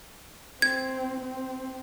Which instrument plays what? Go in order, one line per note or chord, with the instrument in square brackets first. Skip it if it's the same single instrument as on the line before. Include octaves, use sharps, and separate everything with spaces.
[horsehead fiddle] C4 [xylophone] G#6
[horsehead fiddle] C4